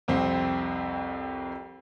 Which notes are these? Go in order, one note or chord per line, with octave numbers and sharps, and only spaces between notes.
C2 F2 C4